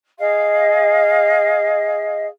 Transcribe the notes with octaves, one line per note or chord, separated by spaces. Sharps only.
G#4 D#5 F5